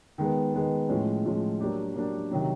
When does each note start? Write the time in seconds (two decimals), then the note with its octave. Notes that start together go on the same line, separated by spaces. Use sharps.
0.18 D#3 G#3 B3
0.54 D#3 G#3 B3
0.89 A2 F3 G#3 C#4
1.24 A2 F3 G#3 C#4
1.60 F#3 A#3 D4 G4
1.96 F#3 A#3 D4 G4
2.31 C3 D#3 F#3